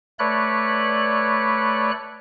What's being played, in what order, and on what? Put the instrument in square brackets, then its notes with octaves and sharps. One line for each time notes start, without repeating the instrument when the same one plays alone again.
[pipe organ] A3 B4 C#5 D5 B5 F#6